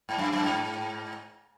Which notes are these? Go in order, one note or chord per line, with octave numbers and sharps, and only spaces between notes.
G#2
F#2
F#2
G#2